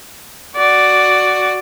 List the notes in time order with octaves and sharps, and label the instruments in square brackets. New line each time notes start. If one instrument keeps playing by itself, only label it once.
[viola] F#4 D5